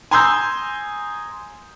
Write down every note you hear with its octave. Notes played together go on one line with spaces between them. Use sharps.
G#5 A#5 C6 D#6 E6 G6